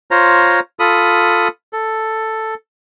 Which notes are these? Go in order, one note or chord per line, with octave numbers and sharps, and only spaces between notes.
F4 C5 C#5 A#5
F4 A4 B5 D#6
A4